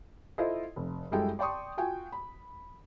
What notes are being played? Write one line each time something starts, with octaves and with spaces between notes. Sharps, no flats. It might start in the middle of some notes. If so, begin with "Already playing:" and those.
E4 F4 A4 C5 D#5
F1
F#2 G3 G#3 E4 A4 G5
D5 G5 A5 C6 C#6 D#6
F4 F#4 G5 G#5
B5